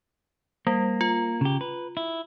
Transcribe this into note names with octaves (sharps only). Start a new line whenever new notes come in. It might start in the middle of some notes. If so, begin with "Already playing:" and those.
G3 A#3
F4
C#3 G4
B4
E4